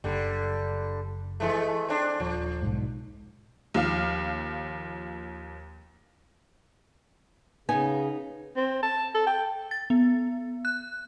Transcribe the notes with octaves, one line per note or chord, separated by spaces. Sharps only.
F#1 D3 G3
E3 G#3 A3
C4 D4
D#1 F3
B1 G#2
D#2 F3 F5 F6
C#3 B3 D#4 G#5
C4
A5
A4
G5
A6
B3
F#6